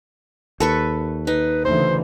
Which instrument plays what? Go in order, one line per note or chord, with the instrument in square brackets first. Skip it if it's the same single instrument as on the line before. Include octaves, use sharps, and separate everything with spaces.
[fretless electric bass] D#2 [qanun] A4 B4 C#6
[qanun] D#4 [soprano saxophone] B4
[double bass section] D2 C#3 E3 [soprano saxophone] C5